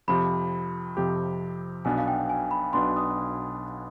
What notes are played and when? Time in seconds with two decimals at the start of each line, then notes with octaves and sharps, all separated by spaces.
0.08 F2 C3 F3 C4 G4 B5
0.97 F2 C3 F3 C4 G4
1.85 B1 B2 B3 D4 G#5
1.98 F5
2.08 G5
2.30 G#5
2.51 B5
2.73 B1 B2 B3 D4 C6
2.96 D#6